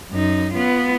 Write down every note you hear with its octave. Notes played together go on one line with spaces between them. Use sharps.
F#2 D#4
B3 F4